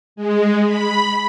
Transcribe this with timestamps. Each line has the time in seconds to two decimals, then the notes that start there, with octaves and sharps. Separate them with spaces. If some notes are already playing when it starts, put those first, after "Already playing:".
0.16 G#3
0.66 B5